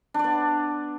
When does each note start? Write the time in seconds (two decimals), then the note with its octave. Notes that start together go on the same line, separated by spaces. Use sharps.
0.14 D4
0.19 D5
0.24 B3